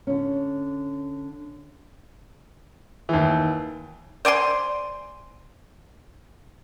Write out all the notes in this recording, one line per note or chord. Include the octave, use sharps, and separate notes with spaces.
D3 C#4
D#2 E3
C5 D5 G#5 C6